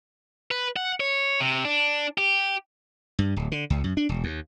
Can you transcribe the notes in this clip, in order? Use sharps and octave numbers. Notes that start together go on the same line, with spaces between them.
B4
F#5
C#5
C3
D4
G4
G2
D1
D3
C#2
F#2
D4
E1
D#2